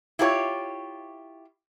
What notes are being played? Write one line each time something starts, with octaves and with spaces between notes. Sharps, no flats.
E4 F4 G4 A#4 C#5